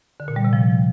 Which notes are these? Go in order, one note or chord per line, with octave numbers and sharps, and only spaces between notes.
D3
A#2
G3
C3
F3